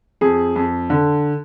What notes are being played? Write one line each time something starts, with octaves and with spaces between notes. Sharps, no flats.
F2 G#4
F2
D3